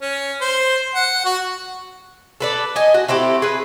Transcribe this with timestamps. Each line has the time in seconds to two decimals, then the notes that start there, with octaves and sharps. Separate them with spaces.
0.02 C#4
0.41 C5
0.95 F#5
1.25 F#4
2.40 A4 B4 D5
2.76 D#5 G#5
2.94 F#4
3.08 A3 C4 E4 G4
3.42 G#4 B4